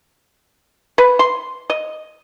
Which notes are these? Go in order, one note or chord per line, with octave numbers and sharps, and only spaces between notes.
B4
C6
D#5